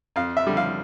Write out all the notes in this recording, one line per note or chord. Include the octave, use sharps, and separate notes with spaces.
F2 F5
E5
D3 G3
F5